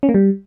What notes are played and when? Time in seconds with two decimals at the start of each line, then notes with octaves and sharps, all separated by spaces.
0.03 C#4
0.09 A#3
0.14 G3